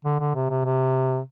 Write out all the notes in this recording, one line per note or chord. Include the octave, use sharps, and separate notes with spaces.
D3
D3
C3
C3
C3